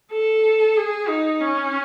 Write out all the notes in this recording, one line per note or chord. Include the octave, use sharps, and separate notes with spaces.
A4
G#4
D#4
C#4